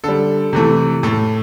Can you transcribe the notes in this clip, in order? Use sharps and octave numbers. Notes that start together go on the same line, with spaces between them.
D3 G3 A4
C3 E3 A3
A2 A3 A4